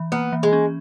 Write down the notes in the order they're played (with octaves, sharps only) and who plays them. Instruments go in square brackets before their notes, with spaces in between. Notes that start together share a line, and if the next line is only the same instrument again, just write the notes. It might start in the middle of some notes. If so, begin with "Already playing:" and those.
Already playing: [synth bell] E3
[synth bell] A#3 [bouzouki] B3
[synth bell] E3
[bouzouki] G#3
[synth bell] C#4